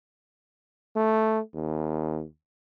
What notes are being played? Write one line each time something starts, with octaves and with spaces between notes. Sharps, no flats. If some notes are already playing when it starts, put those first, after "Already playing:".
A3
D#2